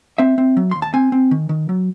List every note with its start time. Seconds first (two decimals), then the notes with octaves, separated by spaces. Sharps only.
0.18 C4 E5
0.38 C4
0.57 F#3
0.71 D#2 C6
0.82 A5
0.94 C4 G#5
1.12 C4
1.31 D#3
1.49 D#3
1.69 F#3